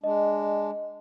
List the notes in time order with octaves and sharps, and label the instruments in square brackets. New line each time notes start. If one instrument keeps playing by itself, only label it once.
[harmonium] G#3 D4 [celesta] D#5